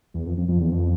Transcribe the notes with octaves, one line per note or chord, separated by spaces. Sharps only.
E2
F2
F2
F2
E2
F2